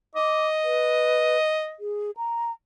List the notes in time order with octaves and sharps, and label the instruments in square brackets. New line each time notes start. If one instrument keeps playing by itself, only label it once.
[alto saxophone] D#5 [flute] D6
[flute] B4
G#4
A#5